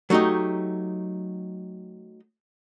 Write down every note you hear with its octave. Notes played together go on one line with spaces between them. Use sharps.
F#3 A3 D#4 G4 D#5